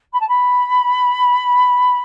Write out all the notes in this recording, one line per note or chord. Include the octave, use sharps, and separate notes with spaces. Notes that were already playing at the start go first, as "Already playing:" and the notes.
B5
A5
B5